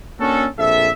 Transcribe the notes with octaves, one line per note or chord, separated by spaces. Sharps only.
A#3 C#4 D4 F#4 A4
A#1 F2 A4 E5